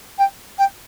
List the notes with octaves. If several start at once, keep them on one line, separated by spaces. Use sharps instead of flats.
G5
G5